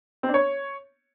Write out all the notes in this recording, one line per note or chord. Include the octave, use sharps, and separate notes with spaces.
C4
D4
C#5